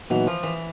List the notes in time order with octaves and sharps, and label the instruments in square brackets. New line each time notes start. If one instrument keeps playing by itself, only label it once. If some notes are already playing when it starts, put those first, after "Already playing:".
[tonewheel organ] A#2 F#3 B3 D#4 F#4 [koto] E3
[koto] F3
E3